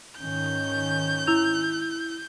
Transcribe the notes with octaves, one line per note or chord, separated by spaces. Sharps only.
G#2 D#3 C#4 G6
E4 E6 F7